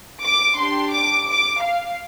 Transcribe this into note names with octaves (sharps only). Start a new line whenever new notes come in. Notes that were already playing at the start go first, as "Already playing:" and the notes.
D6
D4 G4 C6
D6
D6
F5